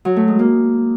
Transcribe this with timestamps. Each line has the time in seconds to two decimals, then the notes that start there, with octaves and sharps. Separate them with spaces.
0.05 F#3
0.16 A3
0.28 G#3
0.39 A#3